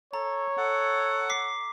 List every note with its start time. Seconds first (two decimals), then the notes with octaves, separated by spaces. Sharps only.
0.14 A4 C#5 A#5
0.57 A4 F#5
1.30 D6 B6 C7